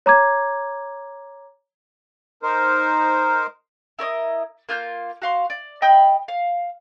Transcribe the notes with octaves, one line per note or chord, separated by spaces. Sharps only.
C#5 A#5 D6 G#6
D#4 A#4 C5
E4 A#4 C#5 D#5
A#3 F4 F6 G6
F#4 F5 C6
D5
D#5 G5 B5 G6
F5